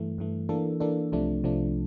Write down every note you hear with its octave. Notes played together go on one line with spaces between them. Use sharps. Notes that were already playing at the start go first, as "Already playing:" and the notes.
Already playing: G2 E3 A3
G2 E3 A3
E3 A#3 D4 A4
E3 A#3 D4 A4
C2 C3 F3 A3 D4
C2 C3 F3 A3 D4